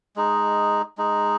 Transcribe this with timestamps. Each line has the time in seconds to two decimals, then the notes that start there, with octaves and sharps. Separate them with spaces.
0.16 G#3 D#4
0.98 G#3 D#4